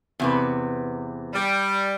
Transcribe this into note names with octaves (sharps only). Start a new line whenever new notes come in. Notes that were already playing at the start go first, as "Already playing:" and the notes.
E2 C3 B4
G3